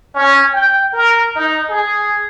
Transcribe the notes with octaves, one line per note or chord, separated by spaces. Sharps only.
C#4
G5
A#4
D#4
G#4